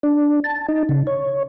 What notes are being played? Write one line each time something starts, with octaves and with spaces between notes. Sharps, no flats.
D4
A5
D#4
C#3
C#5